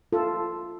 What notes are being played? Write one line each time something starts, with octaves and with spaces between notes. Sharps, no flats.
F4 A4